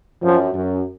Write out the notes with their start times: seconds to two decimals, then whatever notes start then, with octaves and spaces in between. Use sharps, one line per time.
0.23 F#2 F3
0.54 F#2